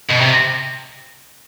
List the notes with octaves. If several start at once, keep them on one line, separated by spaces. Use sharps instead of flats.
B2
C3